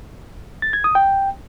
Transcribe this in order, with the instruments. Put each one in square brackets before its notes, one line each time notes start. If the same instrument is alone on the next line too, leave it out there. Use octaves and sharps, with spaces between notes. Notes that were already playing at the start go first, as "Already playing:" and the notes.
[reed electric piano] A6
G#6
D#6
G5